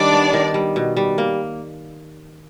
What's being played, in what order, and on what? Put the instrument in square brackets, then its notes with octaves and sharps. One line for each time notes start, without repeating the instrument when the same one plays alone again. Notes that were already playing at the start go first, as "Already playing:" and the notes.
Already playing: [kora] D#3 G3 D#4 [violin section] D4 D5
[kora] B3
D#3
G3
B2
G3
A#3